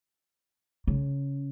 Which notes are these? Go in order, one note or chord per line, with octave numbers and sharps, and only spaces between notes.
C#3